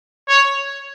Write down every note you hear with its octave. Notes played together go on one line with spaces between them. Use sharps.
C#5